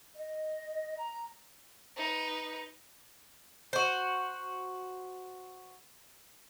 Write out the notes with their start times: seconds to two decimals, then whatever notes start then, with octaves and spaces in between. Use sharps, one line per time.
0.15 D#5
0.96 A#5
1.96 D#4 B4
3.73 F#4 C5